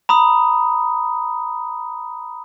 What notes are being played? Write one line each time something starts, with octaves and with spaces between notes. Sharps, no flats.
A#5 B5 D#6